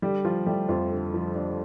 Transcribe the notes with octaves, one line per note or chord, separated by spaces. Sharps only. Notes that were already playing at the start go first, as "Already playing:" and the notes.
D3 G3 G4
F3 F4
G3 A3 G4
F2 F3 F4
D3
F3
A3 D4